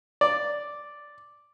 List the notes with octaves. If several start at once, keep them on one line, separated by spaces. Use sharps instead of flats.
D5